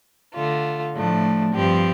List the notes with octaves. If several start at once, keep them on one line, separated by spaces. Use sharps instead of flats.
D3 A3 F4
A2 F3 A3 D4
G2 F3 C4 G4